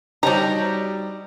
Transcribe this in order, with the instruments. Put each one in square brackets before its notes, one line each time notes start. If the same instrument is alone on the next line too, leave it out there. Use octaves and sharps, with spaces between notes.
[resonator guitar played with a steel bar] G3 D#4 [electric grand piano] F#4 G4 [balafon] C5 C#5 A5 [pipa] A#5